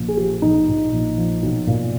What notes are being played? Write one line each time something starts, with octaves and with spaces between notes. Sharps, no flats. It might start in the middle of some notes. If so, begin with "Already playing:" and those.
Already playing: A#1 A#2
G#4
F3 G4
A#1 D#4
A#2
A#1
F3
B1
A#2